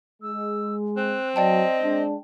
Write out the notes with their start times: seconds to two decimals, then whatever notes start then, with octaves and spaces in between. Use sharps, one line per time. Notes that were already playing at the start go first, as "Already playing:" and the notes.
0.22 G#3 E6
0.97 C4 F#6
1.36 F#3 D5 D#5 G5 A5
1.82 G#3 D4